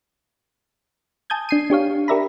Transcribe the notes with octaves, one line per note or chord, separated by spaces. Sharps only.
G#5 A5 D#6 G6 G#6
D4 C7 D#7
D4 G4 C#5 F5
G4 A#4 D5 E5 A#5 B5